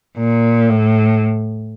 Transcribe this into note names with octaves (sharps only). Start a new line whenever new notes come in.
A#2
A2